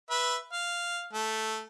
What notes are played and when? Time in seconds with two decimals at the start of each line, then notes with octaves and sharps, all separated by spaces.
0.10 B4 E5
0.53 F5
1.13 A3